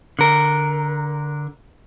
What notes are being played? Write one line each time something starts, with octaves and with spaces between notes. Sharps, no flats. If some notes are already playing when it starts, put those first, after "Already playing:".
D3 A#4